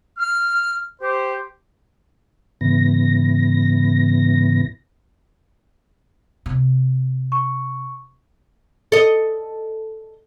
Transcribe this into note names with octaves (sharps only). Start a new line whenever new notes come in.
F6
G4 C5
G#2 C#3 E3 B3 A#6
C3
C#6
A4 D#5